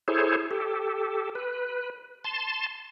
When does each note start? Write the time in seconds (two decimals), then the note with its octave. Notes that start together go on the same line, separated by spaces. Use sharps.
0.08 E4 G#4 A4 C5 C#5
0.51 G4 A4
1.35 B4
2.24 A5 C6